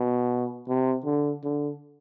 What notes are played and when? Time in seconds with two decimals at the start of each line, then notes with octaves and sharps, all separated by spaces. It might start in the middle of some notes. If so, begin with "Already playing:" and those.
Already playing: B2
0.68 C3
1.05 D3
1.43 D3